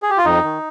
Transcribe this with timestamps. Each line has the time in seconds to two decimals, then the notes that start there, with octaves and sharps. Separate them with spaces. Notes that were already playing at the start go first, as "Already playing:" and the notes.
0.03 G#4
0.10 G4
0.18 F4
0.25 F2 D#4
0.44 D#3